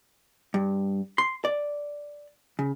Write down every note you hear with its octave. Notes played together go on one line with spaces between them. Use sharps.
G2
C6
D5
C#3